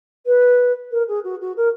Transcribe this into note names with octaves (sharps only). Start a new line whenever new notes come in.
B4
A#4
G#4
F#4
F#4
A#4